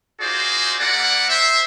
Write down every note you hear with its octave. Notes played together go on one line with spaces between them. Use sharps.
D#4 F4 F#4 G#4 C5 D5
A#3 E4 A#4 D5 F#5
C5 E5